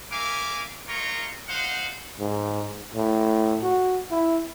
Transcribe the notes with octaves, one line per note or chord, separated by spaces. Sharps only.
A#4 E5 F5 G#5 D6
D#4 F4 A#4 C#5 A#5 C#6
D#4 C5 F5 F#5
G#2
A2
F#4
E4